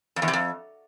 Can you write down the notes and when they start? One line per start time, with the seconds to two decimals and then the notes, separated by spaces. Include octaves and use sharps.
0.16 F2
0.22 E2
0.28 C3
0.33 F2